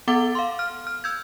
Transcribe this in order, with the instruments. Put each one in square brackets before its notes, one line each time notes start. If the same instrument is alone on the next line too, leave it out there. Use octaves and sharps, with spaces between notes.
[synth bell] B3 A4 F#5 D6 A6 G7
F5 C6
F6
F6
E6 G6 G#6